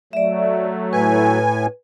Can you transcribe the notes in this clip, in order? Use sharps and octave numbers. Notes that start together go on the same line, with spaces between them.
F#3 A3 D5 E5
A2 B4 G#5